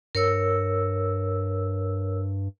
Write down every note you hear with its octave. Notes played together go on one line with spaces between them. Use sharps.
G2 A#4 C#5 E6